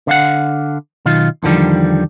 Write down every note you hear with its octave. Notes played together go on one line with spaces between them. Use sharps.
D3 F5 F#5
B1 D#3 F4
E2 D3 D#3 F3 G3